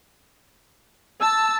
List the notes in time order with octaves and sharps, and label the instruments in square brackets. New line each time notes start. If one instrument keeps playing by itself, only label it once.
[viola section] A5 [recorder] E6